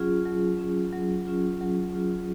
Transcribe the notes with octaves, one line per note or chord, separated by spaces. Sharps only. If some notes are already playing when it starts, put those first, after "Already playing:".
Already playing: F#3 C#4 F4 G#4
F#3
C#4 F4 G#4
F#3
C#4 F4 G#4
F#3
C#4 F4 G#4